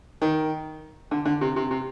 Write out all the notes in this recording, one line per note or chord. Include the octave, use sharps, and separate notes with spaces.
D#3
D3
D3
C3
C3
C3